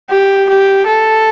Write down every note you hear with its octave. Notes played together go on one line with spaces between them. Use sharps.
G4
G4
A4